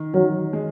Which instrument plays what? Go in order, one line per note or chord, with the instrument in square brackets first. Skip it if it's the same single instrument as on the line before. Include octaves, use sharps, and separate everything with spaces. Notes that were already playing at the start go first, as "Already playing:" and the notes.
Already playing: [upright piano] D#3
[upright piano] D#3 [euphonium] F#3
[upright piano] G#3